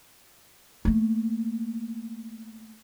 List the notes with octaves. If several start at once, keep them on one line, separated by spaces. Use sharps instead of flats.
A3 A#3